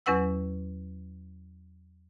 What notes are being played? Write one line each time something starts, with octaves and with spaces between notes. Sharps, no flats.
E2 F#3 C#4 B4 F#5 E6